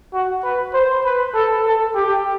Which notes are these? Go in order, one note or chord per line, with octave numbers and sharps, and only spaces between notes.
F#4
B4
C5
B4
A4
A4
G4